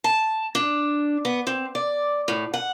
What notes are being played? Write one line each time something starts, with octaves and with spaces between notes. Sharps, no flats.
A5
D4
B3
C4
D5
A2
F#5